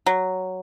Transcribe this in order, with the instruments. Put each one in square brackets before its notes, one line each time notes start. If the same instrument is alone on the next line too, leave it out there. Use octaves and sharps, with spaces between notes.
[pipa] F#3